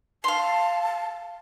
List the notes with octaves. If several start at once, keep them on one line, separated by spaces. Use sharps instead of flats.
F5 A5 C6